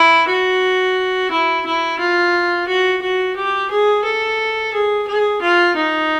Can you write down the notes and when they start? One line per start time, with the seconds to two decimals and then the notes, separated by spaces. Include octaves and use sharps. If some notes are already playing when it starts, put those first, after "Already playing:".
Already playing: E4
0.28 F#4
1.31 E4
1.66 E4
1.99 F4
2.68 F#4
3.02 F#4
3.36 G4
3.71 G#4
4.04 A4
4.73 G#4
5.07 G#4
5.42 F4
5.76 D#4